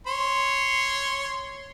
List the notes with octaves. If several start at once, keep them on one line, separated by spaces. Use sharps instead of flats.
C#5 C6